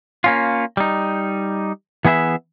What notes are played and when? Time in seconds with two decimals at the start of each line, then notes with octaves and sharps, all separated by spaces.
0.24 A#3 C#4 F4
0.77 G3 D#4
2.05 E3 B3 G#4 B4 E5